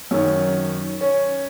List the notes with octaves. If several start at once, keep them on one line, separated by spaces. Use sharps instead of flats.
F#2 D#3 C#4
C#4